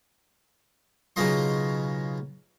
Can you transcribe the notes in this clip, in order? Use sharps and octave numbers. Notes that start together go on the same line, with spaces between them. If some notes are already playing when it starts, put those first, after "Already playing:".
B1 C#3 B3 F4 D#5 C6